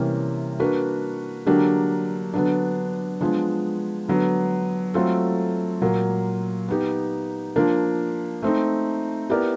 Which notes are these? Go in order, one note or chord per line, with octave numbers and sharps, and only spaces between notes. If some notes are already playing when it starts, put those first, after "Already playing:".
Already playing: C3 E3 G3 A#3 C#4
A#3 D4 F#4 B4
D3 F#3 A#3 D4 G4
D3 F#3 B3 D4
F3 G#3 B3 D4
D3 F#3 B3
F#3 A3 C4 F4 A4
A#2 F#3 A#3
B3 D#4 G4
F3 A#3 D4
A3 C4 D#4
B3 E4 G4 A#4 D5